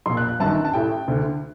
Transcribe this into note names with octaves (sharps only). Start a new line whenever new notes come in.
A#1 A#2 C6
F#6
F#6
G1 F#2 D#3 A5
A5
A1 A2 G5
D2 D3